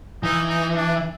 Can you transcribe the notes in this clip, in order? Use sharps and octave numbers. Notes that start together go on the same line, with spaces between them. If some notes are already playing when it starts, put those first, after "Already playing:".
E3 D#4
D#4
D4